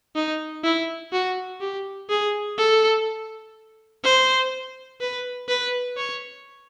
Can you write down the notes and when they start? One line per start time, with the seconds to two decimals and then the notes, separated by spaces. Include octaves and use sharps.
0.16 D#4
0.64 E4
1.13 F#4
1.61 G4
2.10 G#4
2.58 A4
4.04 C5
5.01 B4
5.49 B4
5.97 C#5